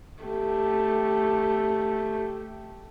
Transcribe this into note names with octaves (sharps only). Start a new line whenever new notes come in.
A3 G4